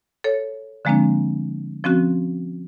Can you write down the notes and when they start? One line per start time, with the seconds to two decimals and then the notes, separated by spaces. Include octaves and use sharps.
0.24 A4 C#5
0.85 D3 F3 G#3 A#3 C4 D4
1.84 F3 C4 C#4 F#4